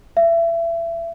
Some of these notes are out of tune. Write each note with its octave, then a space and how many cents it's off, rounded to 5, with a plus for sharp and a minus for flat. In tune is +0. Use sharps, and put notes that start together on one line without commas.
E5 +30